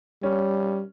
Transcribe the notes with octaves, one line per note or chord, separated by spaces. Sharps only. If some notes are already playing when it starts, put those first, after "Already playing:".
G3 C#4